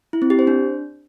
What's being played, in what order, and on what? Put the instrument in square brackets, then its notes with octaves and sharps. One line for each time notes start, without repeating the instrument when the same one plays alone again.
[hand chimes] E4
C4
G4
C5
D4